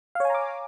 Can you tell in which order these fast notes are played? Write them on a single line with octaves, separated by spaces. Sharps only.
F5 C#5 G#5 A#5 D6